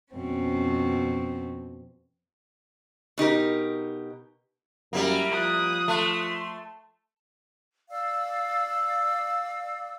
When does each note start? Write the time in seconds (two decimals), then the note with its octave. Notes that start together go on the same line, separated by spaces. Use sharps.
0.14 F2 B2 C4 C#4
3.18 B2 D#4 G4 A#4
4.93 F#2 G3 A#3 E4 A#4
5.32 F3 D#6 F#6
5.88 A3 C6
7.90 D5 F5 E6